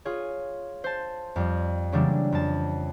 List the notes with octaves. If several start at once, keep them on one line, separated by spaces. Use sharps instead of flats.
F4 G#4 C#5
C5 A5
F2 G3
C#3 E3 F#3 G3 A#3 D4
F2 A5